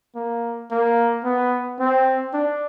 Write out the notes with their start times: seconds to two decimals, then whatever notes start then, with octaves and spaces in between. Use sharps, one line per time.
0.15 A#3
0.71 A#3
1.25 B3
1.80 C4
2.34 D4